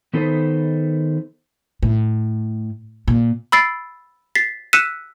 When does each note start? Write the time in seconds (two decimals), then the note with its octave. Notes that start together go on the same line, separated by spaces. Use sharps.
0.13 D#3 B3 D#4 A4 B4 C5
1.83 A2
3.08 A#2
3.52 B5 E6 A6 C7 D7
4.35 A6 B6 C7
4.73 E6 F#6 B6 C#7 D#7 E7